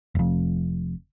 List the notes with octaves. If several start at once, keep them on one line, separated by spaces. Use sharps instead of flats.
F1 F2